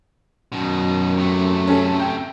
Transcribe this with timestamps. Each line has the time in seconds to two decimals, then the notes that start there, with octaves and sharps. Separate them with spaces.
0.52 F#2 B2 D#3
1.17 C3 A3
1.67 C#4 A4
1.99 G5